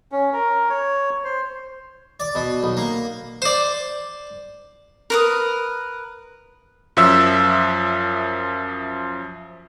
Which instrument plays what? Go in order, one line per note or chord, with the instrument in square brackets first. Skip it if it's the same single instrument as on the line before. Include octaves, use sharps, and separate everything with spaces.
[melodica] C#4
A#4
C#5
C5
[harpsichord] D5
B2
B1
A#3
C5 D5
[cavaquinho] A#4 B4 D#6
[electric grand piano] F#2 F3 E5 E6